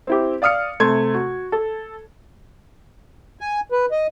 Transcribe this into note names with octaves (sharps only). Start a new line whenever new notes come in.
C4 E4 G4
D5 F5 D#6 F6 C#7
C3 A3 C6 G#6
F#4
A4
G#5
B4
D#5